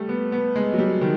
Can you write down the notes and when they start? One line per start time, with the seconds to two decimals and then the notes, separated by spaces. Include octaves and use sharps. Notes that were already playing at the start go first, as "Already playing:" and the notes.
Already playing: G3 A3
0.09 B3
0.32 B3
0.56 G#3
0.73 F#3
0.79 G3
1.01 D#3